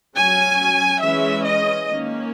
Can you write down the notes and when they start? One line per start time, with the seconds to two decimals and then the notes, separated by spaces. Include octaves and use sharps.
0.16 F#3 C#4 G#5
1.01 E3 G#3 C#4 E5
1.44 D#5
1.88 D#3 A#3 C#4